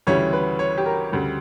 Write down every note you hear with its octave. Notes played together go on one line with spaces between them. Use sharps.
D2 C#3 E3 G3 C#5
B4
C#5
G4
A#4
D2 C#3 G3